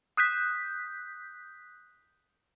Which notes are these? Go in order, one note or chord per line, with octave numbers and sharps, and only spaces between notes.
D#6 F#6 G6 B6